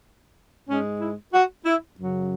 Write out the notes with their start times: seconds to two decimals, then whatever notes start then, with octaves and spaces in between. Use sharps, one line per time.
0.69 G#2 G#3 C#4
1.01 E4
1.33 F#4
1.65 E4
1.97 F#2 C#3 F#3